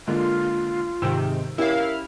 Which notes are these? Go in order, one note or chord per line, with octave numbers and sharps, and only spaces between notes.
D3 G#3 A#3 F4
G#2 C3 D#3 G5 E6 E7
C#4 E4 G4 A#4 F5